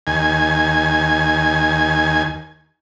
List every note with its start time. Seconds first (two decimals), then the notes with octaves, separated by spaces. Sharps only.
0.07 D#2 G#5